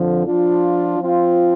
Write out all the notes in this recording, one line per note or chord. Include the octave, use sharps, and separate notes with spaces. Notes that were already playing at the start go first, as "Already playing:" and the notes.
Already playing: F2 D3 F3
F3 D4 F4
F3 C4 F4